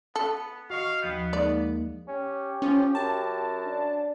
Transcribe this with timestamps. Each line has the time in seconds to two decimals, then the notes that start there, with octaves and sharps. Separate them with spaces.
0.16 B3 A4
0.70 F#4 D#5 F5 C#6
1.02 D#2 F3 B3 G6
1.33 G#3 A#3 D#4 D5
2.08 C#4 G4
2.62 F3 C#4
2.95 F#2 A5
3.65 D4